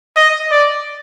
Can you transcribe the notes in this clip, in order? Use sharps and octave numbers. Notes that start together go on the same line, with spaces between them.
D#5
D5